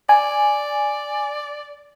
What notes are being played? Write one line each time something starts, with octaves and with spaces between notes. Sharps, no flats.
D5 G#5